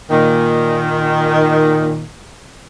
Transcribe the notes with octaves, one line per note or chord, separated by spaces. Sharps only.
A#2 D#3